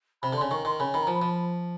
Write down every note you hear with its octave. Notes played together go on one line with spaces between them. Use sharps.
C3 B5
D3
C6
C#3
D#3 C#6
D#3 C6
C#3 B5
D#3 B5
F3 A#5
B5
F3